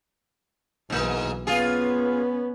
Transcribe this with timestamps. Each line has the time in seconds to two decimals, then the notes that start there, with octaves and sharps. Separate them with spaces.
0.90 B1 G#2 E3 A#3
1.47 B3 C#4 F4 G#4